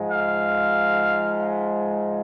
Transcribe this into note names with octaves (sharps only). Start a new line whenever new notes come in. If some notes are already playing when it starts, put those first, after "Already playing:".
Already playing: G#2 F3 G#3
F5